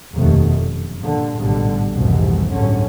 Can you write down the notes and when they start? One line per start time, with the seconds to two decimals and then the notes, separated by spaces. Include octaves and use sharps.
0.14 F1 D#2 B2 D#3 A3
0.54 F#2
1.00 G2 A#2 D3
1.37 A1 G#2 B2 D3 G3
1.92 F1 C2 G#2 B2 D#3 E3
2.53 G1 C#2 A2 D3 F#3 C#4